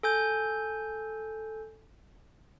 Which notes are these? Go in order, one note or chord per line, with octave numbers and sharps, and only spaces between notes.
A4 G#5 G6